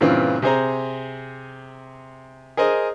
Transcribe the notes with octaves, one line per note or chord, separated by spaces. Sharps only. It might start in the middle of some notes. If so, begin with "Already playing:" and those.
G2 A#2 C#3 E3 C4 F4
C3 G#4 C5 A#5
G#4 A#4 C5 D#5